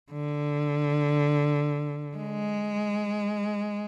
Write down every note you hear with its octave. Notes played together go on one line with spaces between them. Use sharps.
D3
G#3